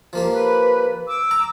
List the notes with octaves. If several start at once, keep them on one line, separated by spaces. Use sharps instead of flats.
F3 A#3 G4
B4
D6 E6
A#5